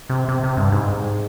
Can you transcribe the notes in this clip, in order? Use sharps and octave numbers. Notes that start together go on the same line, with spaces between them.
C3
C3
C3
G2
G#2